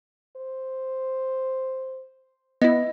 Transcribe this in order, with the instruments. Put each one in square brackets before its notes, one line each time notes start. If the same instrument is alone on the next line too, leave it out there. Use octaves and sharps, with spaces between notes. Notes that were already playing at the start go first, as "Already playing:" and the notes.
[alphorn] C5
[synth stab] B3 E4 [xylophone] D#5